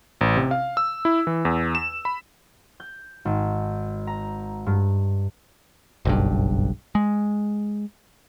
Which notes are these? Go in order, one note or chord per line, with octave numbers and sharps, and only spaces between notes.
A1
C3
F5
E6
E4
E3
E2
E7
B5
G6
G#1
A#5
G2
F#1 B1 G2
G#3